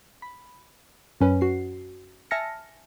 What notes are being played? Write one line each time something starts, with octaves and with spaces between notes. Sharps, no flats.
B5
F#2 C#4 B4
F#4 C7
E5 G#5 A5 F6 A#6 C#7